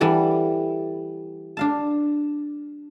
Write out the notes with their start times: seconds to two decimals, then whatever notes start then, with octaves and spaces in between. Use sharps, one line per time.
0.01 E3 G3 A4 F#5
1.57 D4 F5 A5